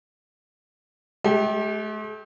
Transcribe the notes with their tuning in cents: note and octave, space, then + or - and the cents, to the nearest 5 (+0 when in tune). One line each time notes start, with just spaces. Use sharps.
A3 -45 G4 +0